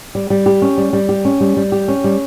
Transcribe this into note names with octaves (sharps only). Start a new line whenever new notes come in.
G3
G3
G4
C#4
G3
G3
G4
C#4
G3
G3
G4
C#4
G3